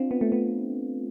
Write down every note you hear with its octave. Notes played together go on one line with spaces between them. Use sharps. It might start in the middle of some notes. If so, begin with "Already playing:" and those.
Already playing: C4 D4 F4
B3
A3
B3